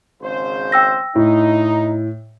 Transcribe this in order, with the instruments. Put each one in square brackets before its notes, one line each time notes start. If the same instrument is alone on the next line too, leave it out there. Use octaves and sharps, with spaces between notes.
[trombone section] G#1 C#3 C5
[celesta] G5 E6 A#6
[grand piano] A2 [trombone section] D#4